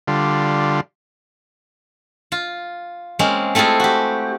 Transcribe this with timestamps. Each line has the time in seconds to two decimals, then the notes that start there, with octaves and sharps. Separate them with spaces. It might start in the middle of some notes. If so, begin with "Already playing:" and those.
0.08 D3 G3 F4
2.32 F4
3.19 G#3 A#3 C4 C#4
3.55 A3 C4 E4 F4 G#4
3.80 F#4 G4